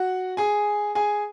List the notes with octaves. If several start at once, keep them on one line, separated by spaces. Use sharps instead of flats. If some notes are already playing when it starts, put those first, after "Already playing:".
Already playing: F#4 F#5
G#4 G#5
G#4 G#5